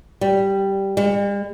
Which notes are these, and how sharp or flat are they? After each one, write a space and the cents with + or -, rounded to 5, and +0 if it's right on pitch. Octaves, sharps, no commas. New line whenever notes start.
G3 -5
G3 +45